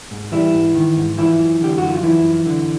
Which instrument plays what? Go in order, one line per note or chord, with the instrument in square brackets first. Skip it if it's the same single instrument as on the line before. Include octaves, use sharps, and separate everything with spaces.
[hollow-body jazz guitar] G#2
E3 G3 E4
G#2
D#3
G#2
E3 F3 E4
F#2
D3 G4
F#2 F#4
F4
E3 F3 E4
F#2
D3